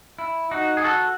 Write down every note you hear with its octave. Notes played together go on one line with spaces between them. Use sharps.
E4
D#4 F#4
G#4
F#4 A4